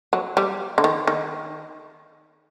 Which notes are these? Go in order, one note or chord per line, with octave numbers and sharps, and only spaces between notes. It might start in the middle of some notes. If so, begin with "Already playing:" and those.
F#3
G3
D3
D#3
D#3